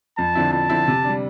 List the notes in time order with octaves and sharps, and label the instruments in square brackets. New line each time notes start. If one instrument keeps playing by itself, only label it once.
[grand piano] F2 [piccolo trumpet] A5
[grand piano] D3 F3 C4 E4
[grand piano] F2 [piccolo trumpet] A5
[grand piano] D3 F3 C4 E4
C3
G3 D4